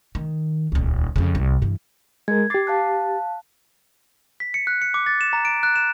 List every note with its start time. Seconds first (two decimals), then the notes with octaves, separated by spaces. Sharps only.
0.15 D#3
0.72 D#1 C#2
1.16 F2 C#3
1.35 C2
1.62 G2 E3
2.28 G#3 A#4 G#6
2.50 G4 D6 A6 C7
2.67 F5 A5 F#6
4.40 B6
4.54 C#7
4.67 F#6
4.82 C#7
4.94 D6
5.06 A6
5.21 E7
5.33 A#5
5.45 D7
5.63 F#6
5.76 E7